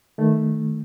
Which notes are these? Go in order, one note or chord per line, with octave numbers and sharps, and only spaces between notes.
D#3 A3